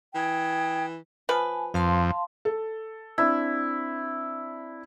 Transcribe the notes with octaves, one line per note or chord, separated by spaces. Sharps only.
E3 G5 D#6 G#6
F3 B4 G#5 A5
F2 F5 A5 C6
A4
C4 D4 E4